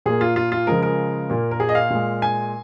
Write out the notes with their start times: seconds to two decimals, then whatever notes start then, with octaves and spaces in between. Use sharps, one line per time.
0.06 A#2 A#3 G#4
0.21 F4
0.36 F4
0.52 F4
0.67 C#3 F3 G#3 A#4
0.83 A#4
1.30 A#2 A#3
1.51 A#4
1.60 G#4
1.69 D#5
1.75 F5
1.90 A#2 G#3
2.22 G#5